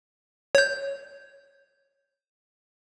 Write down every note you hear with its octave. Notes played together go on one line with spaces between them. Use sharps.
C#5 G6